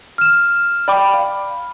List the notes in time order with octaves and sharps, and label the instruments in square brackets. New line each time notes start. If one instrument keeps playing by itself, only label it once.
[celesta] F6 E7
[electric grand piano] D5 G5 D6 [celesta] B5
[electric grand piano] F5